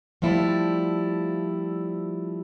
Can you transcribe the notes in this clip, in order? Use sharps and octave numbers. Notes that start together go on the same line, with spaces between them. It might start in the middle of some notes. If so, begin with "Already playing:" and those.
F3 G3 A3 E4 F4 D5